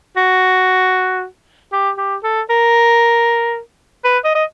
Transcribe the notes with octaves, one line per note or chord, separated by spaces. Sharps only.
F#4
G4
G4
A4
A#4
B4
D#5
D#5